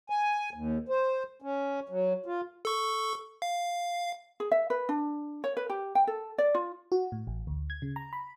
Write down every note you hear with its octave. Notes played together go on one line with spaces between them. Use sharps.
G#5
D#2
C5
C#4
F#3
F4
A4 C#6
F5
G#4
E5
B4
D4
C#5
B4
G4
G5
A4
D5
F4
F#4
A2
A1
D2
G#6
C#3
A#5
B5